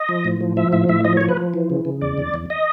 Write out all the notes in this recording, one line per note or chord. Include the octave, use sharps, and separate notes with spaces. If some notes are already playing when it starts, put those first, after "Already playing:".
Already playing: D#5
F3
A2
F3
F3 E5
A2 E5
A2 E5
F3 D#5
C#5
F3
B4
F3
E3
C#3
C#3
E2 D5
E2
E2
D#5